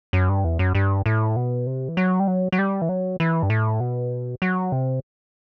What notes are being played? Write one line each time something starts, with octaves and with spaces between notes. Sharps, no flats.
F#2
G2
E2
F#2
G2
A2
B2
C3
E3
F#3
G3
F#3
F#3
G3
E3
F#3
E3
G2
A2
B2
F#3
C3